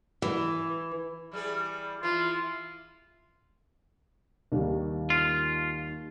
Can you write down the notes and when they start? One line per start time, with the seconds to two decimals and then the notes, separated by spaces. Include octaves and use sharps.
0.22 E3
1.32 E3 G3 G#4
2.03 E3 F4
4.52 D#2 D#3 G3
5.10 F4